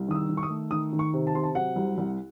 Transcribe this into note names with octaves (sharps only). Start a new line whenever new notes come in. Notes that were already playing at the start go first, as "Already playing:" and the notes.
Already playing: C2
D#3 D#6
E6
D#3
C#6
D#6
A3
D#3 D#6
D#3
C#6
C3
A5
C3 C6
A5
F#3 F#5
C2
C2